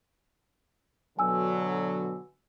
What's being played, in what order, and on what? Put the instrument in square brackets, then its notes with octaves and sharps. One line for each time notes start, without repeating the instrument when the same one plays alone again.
[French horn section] B2 D3 F#3 [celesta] G#5 E6